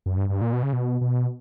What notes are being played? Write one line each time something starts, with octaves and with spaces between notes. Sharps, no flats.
F#2
G2
G2
A#2
B2
C#3
B2
B2